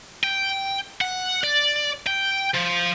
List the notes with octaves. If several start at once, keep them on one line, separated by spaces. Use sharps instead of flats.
G5
F#5
D5
G5
F3